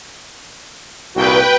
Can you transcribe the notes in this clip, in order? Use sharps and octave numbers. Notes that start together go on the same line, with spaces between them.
C2 A#2 F#4 B4 G5